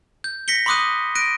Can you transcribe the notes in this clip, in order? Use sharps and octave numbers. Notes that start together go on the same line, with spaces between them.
G6
A#6 B6 C#7 G7
B5 C6 D6 D#6 F#6 D#7
F#6 A#6 D7 D#7